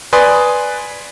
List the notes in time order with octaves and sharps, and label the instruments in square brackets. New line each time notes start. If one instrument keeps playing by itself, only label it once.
[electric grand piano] B4 D5 G#5 C6 D#6